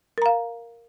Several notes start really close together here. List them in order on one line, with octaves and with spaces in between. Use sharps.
A#4 A#5 F5